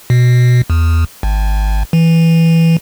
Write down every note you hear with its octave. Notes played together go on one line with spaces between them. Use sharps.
B2
E2
G#1
E3